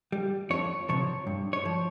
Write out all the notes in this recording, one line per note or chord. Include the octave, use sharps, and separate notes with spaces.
G3
F2 C#5
C3 F3 C#5
G2
C#5
F3